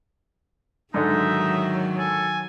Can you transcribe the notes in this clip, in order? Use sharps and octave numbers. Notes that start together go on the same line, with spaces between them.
G#2 D3 D#3 F#3 D#4 E5
A4 G#5